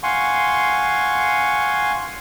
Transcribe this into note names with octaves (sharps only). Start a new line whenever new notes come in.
F5 F#5 G#5 C6 C#6